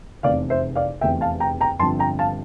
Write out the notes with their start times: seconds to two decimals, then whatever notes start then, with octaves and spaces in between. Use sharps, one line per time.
0.23 F1 E2 C3 D5 F5
0.50 C5 E5
0.75 D5 F5
1.01 F1 E2 C3 E5 G5
1.21 F5 A5
1.40 G5 A#5
1.61 G5 A#5
1.79 G1 G2 F3 C4 A5 C6
1.99 G5 A#5
2.19 F5 A5